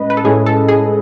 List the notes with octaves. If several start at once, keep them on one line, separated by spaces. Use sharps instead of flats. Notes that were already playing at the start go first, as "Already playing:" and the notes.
Already playing: A2 G#3 C#4 B4 D#5
B4
A4
A2 G#3 C#4 E4 G#4
A4
G#4